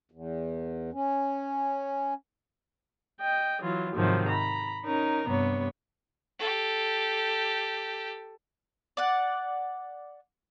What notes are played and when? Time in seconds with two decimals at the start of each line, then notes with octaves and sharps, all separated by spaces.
0.12 E2
0.93 C#4
3.21 D#5 G5
3.61 E3 F#3 F4
3.95 G#2 C3 D#3 F3 F#3
4.29 A#5 B5
4.85 C#4 D#4 A#4 A#5
5.27 G2 C3 B3 C#5
6.39 G4 A4
8.97 D5 F#5